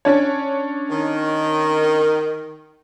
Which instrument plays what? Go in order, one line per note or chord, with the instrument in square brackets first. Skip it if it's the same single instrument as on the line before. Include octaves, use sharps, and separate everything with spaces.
[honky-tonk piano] C#4 D4 C#5
[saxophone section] D#3